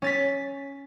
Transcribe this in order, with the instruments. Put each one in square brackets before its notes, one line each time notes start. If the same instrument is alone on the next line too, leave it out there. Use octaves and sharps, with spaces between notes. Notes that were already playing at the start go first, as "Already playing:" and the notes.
[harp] C#4 A6 B6